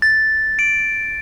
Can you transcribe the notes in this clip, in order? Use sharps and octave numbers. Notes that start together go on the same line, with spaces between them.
A6
D7